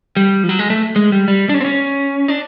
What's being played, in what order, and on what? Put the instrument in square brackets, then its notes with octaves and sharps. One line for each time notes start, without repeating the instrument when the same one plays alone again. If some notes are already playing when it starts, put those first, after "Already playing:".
[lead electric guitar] G3
F3
F#3
G#3
A3
G#3
G3
G3
D4
C#4
C4
C#4
D4